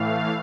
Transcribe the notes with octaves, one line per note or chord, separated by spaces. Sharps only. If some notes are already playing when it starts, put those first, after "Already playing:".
Already playing: A2 E3 A3 F5